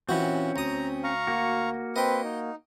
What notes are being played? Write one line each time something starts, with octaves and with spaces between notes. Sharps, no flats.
A#2 E3 C4 C#4 F#4
D2 A#5 D#6
F5 A#5 C#6
A#3 F#4
C4 B4 D#5 G5
D#4